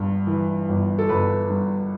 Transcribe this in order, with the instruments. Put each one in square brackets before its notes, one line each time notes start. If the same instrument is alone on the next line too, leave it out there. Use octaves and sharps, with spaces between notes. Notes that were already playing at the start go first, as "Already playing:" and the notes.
Already playing: [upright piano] G1 G2
E3
G1
A4
G1 B4
G2